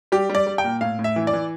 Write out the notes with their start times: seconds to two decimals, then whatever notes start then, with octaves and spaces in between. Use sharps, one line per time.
0.12 G3 G4
0.30 G3
0.35 D5
0.47 G3
0.58 G5
0.64 A#2
0.81 A2 F5
0.99 A2
1.04 E5
1.16 E3
1.27 D5
1.33 E3